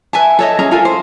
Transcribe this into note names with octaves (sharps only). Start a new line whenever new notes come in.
B4 E5 G#5 A5
A4 C#5 D#5
C#4 G#4 E5 A#5
F4 A4 A#4 G#5
C5